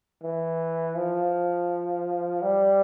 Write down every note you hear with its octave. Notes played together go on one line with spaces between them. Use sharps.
E3
F3
G3